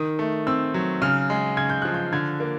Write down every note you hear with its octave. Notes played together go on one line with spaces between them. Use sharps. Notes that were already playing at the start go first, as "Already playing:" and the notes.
Already playing: D#3 D#6
A3
C4 E6
F#3
C#3 F6
G#3
C#3 G#6
G6
F3 F#6
G6
D3 G#6
A#3